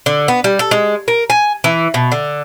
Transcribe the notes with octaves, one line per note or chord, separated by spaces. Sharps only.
D3
B3
G3
A4
G#3
A#4
G#5
E3
B2
D3